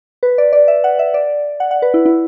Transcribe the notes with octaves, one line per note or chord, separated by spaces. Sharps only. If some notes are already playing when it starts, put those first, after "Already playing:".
B4
D5
D5
E5
F#5
E5
D5
F#5
F#5
B4
E4
E4